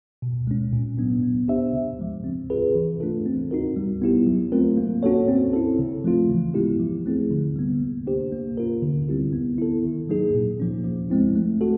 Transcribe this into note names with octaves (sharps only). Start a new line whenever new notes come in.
B2
G#3 C#4
A#2
F#3 B3 D4
B3
D4 G4 C5 E5
C#3
F3 G#3
C4
F4 G#4 B4
E3
A3 D4 F4 A4
C4
D#4 F#4 A#4
G3
B3 E4 G4
F#3
A3 C4 F4 A#4
A#3
C#4 F#4 A4 C#5
C4
E4 A4
C#3
F3 A3 C4 F4
E3
G#3 B3 E4 G4
F3
A3 C4 E4 G#4
D3
G3 B3
A#3
D4 G4 C5
A#3
C#4 F4 A#4
D3
G3 C4 E4 G4
B3
E4 A4
D#3
F#3 A#3 D#4 G#4
A#2
F3 A#3 C#4
F3
G#3 C4 E4
A3
F#4 A4